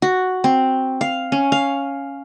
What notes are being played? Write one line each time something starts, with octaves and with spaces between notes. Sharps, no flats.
F#4
C4
F5
C#4
F5